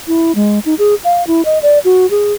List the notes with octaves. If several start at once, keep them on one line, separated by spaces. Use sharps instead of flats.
E4
G#3
D#4
G#4
F5
E4
D#5
D5
F#4
G#4